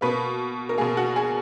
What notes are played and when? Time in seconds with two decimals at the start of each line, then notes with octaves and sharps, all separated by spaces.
0.01 B2 A#3 B4
0.69 A#4
0.78 B2 A#3 G#4
0.97 F#4
1.16 G#4